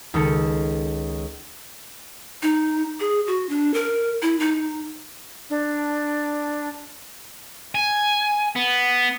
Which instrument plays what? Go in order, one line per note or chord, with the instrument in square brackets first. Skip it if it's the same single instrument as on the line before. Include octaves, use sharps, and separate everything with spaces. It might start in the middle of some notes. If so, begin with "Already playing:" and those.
[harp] C#2 D#3 D#4 A4 C#7
[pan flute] D#4
G#4
F#4
D4
A#4
E4
D#4
[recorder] D4
[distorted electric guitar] G#5
B3